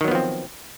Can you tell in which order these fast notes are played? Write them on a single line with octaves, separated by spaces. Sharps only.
D#3 F#3 B3 F3 C4